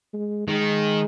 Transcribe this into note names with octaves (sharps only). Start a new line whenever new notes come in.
G#3
D#3 G#3